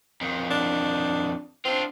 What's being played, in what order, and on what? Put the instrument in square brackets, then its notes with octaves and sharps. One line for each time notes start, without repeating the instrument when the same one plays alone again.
[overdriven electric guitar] F2 D#3
[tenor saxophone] D4
[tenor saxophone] C4 [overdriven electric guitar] D4 F4